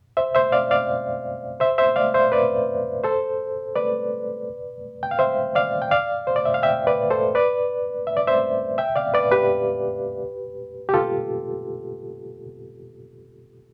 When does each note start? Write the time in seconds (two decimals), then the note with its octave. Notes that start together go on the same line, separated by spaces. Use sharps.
0.17 C5 E5
0.35 C5 E5
0.52 D5 F5
0.71 D5 F5
1.60 C5 E5
1.78 C5 E5
1.96 D5 F5
2.14 C5 E5
2.32 B4 D5
3.04 A4 C5
3.76 B4 D5
5.03 G5
5.11 F5
5.19 C5 E5
5.55 D5 F5
5.82 G5
5.91 D5 F5
6.27 C5
6.36 D5
6.46 E5
6.54 F5
6.63 E5 G5
6.87 B4 D5
7.11 A4 C5
7.35 B4 D5
8.07 E5
8.17 D5
8.27 C5 E5
8.78 E5 G5
8.96 D5 F5
9.14 B4 D5
9.32 G4 B4
10.89 G4
10.94 F4 A4